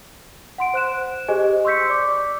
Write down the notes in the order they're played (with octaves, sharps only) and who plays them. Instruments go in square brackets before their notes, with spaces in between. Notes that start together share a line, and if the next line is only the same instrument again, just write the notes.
[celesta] F#5 C6 D7
C5 F#6 E7
G4 G#4 C5 D#5 G#5
C6 C#6 E6 G6 B6 C#7
D5 D6